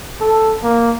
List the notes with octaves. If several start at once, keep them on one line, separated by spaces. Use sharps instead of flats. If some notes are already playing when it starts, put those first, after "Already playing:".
A4
A#3